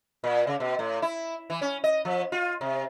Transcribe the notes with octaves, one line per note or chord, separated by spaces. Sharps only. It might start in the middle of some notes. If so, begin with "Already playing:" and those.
A#2
C#3
B2
A2
E4
E3
C#4
D#5
F3
F4
C3